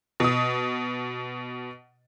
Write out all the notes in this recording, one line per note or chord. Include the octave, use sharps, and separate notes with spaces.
B2 D#6